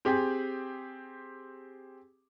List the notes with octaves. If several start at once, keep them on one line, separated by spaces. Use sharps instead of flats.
C4 G4 G#4